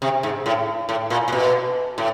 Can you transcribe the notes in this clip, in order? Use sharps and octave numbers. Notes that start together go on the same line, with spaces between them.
C3
G#2
A2
A2
A#2
A#2
B2
A2